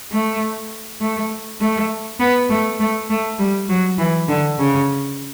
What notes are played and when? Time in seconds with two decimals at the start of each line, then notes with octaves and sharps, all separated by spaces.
0.12 A3
1.01 A3
1.61 A3
2.20 B3
2.50 A3
2.80 A3
3.10 A3
3.39 G3
3.69 F#3
3.98 E3
4.28 D3
4.59 C#3